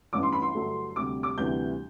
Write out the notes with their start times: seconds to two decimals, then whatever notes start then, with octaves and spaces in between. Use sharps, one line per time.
0.13 A1 G2 E3 D6
0.23 C6
0.32 B5
0.42 C6
0.55 G2 D3 F#3 A3
0.96 D2 C3 G3 D6
1.23 D6
1.37 D2 C3 E3 G3 G6